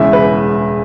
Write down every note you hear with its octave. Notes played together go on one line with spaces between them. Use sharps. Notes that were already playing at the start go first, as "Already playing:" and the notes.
Already playing: E1 E2 C#3 E5
B4